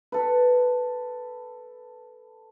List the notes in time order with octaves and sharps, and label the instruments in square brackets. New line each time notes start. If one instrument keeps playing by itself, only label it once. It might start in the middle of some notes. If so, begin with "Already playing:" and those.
[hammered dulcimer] A4 B4